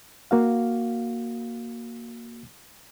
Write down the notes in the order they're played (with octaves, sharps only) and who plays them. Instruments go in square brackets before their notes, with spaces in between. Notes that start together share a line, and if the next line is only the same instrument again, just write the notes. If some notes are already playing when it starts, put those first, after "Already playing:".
[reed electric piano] A#3 F#4 F5